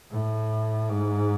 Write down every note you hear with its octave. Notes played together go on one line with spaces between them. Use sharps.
A2
G#2